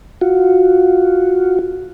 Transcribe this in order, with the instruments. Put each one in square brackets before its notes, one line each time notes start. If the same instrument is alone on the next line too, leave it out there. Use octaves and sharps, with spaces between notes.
[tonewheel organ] F4 F#4